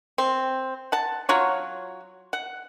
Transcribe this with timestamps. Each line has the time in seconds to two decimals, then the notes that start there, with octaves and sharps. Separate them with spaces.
0.18 C4
0.92 F#5 A5
1.29 F#3 F4 F#4 C#5
2.33 F#5